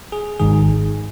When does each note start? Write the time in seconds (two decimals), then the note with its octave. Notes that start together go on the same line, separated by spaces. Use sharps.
0.12 G#4
0.40 G#1 G#2 D#3 G#4